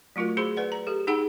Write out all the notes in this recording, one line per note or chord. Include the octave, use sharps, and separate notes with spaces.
F#3 A3 F4 F#4 A#4
F#4 G#4 C5 B5 C6
B4 D5 F#5
A#5
G4 A4
D#4 G#4 F#5 G5 B5